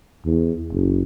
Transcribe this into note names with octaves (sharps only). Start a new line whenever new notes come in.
E2
F#1